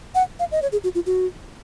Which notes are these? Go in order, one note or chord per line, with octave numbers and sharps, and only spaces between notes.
F#5
F5
D#5
C#5
G#4
F#4
F4
F#4